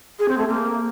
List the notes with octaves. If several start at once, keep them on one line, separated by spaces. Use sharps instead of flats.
G#4
C4
A3
A#3